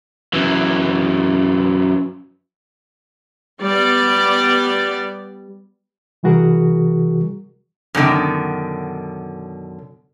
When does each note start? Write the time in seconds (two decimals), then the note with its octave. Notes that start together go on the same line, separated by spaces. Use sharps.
0.33 F#2 E3
3.63 G3 B3 D5
6.23 C3 E3 G3 F#4 G#4 A#4
7.95 F#2 B2 D3 D#3